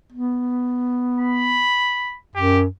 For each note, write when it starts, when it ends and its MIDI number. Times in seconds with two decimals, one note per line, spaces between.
0.12 1.63 59
1.20 2.17 83
2.36 2.66 42
2.36 2.61 67